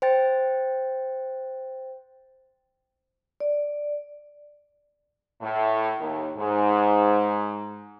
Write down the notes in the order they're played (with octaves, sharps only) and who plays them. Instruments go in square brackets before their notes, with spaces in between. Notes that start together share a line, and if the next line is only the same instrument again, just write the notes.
[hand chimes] C5 G5 A6
[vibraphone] D5
[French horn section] A2
D#2
G#2